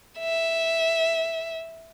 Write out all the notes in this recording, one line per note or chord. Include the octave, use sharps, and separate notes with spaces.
E5